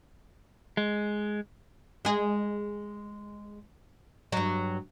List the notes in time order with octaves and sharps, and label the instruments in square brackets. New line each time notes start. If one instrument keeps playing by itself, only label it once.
[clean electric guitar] G#3
[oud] G#3 G#4
G2 F#3